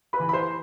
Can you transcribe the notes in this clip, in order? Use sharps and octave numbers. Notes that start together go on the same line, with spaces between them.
B4 B5
E3
B5
C5 C6